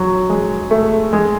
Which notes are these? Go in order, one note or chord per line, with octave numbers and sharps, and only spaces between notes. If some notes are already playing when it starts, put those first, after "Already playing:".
Already playing: F#3
G#3
A3
G#3